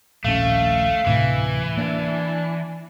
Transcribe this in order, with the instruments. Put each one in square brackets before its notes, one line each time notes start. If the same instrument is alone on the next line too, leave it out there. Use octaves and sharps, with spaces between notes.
[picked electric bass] D#1 A#1 C#4 [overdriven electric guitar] A3 [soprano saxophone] F5
[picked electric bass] D2 A2 C3 [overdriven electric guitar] E3
[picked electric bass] A#3 [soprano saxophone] D4